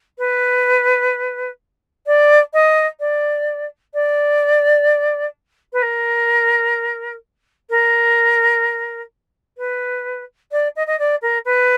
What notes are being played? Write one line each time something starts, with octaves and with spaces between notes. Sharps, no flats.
B4
D5
D#5
D5
D5
B4
A#4
A#4
B4
D5
D#5
D#5
D5
A#4
B4